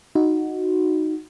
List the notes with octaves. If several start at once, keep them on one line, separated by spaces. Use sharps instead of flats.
D#4 F#4